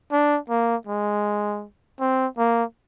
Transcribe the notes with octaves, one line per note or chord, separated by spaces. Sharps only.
D4
A#3
G#3
C4
A#3